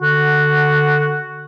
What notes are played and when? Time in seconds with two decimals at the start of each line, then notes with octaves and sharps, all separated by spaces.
0.02 D3 F#4